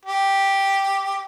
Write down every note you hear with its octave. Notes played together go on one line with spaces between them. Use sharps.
G4